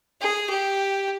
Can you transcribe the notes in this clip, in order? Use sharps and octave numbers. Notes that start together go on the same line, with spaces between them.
G#4
G4